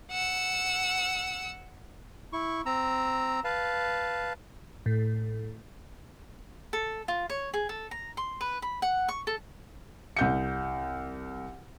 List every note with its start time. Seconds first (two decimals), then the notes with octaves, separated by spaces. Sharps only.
0.11 F#5 E6
2.33 E4 C#6
2.66 C4 A#5 E6
3.44 B4 F5 A5
4.86 A2
6.73 A4
7.08 F4
7.30 C#5
7.54 G#4
7.69 A4
7.91 A#5
8.17 C6
8.41 B4
8.62 B5
8.82 F#5
9.08 C#6
9.27 A4
10.17 C2 G6 C#7